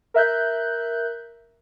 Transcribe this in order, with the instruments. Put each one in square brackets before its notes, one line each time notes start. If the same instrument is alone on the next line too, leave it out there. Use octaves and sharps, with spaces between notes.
[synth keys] A#4 E5 F#6 G6